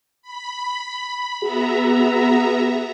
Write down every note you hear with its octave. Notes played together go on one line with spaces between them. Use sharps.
B5
B3 F#4 G#4 E5 A#5